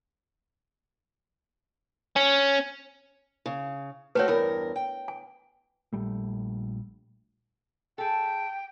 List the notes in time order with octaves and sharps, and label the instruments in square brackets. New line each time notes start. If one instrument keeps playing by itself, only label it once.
[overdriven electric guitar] C#4
[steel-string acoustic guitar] C#3
[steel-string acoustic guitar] A3 C4 F#4 [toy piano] B4 C#5
[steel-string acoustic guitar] E2 G2 A#4
G5
[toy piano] G#5
[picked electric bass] A#1 G3 A3
[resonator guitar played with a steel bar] G#4 A4 [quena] G5